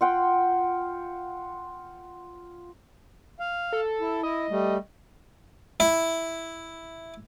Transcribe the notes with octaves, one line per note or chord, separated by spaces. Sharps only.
F4 F#5 G5
F5
A4
E4
E4 D#5
G3 A3
E4